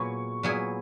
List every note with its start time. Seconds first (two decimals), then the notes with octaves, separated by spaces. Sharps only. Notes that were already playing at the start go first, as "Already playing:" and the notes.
Already playing: A#2 F#3 B3 E4 G#4 C#6
0.43 A#2 F#3 B3 E4 G#4